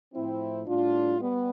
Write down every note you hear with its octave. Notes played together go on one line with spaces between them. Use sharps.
A2 F3 C4 E4
A2 G3 D4 F4
G3 B3